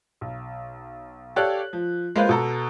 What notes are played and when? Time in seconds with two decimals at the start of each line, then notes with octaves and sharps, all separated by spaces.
0.21 B1
1.36 G4 A4 C#5 D5 F5 F#6
1.73 F3
2.16 G#3 A#3 F4 B4 C5 F5
2.29 B2 A4 A#5